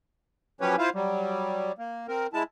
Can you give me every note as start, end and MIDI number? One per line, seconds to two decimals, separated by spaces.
0.61 0.76 53
0.61 0.76 54
0.61 0.76 61
0.61 0.76 67
0.61 0.76 71
0.61 0.76 73
0.78 0.90 64
0.78 0.90 65
0.78 0.90 72
0.78 0.90 77
0.94 1.72 54
0.94 1.72 55
1.78 2.07 58
2.08 2.27 60
2.08 2.27 70
2.33 2.43 56
2.33 2.43 64
2.33 2.43 81